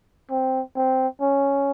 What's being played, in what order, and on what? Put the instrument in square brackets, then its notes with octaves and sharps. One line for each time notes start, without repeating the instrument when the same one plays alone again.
[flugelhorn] C4
C4
C#4